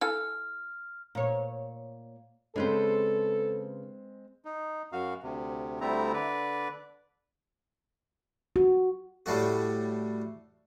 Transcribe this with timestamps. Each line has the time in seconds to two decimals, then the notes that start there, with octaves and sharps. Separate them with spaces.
0.01 E4 A4 G#5 F6
1.15 A#2 C#5
2.56 C#3 G#3 C4 A4 B4 C5
4.45 D#4
4.92 F#2 F#4 F5
5.23 D2 C3
5.81 D2 G3 A3 C4 E4 A#5
6.13 D3 B4 D5
8.56 F#4
9.26 A2 G3 A3 F#4